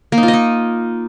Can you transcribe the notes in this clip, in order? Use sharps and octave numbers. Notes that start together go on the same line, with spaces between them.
A#3
D#4
F4
D#5
D#4